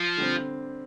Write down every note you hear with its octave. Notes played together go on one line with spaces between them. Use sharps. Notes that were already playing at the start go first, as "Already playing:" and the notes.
Already playing: F3
D3 G3 C4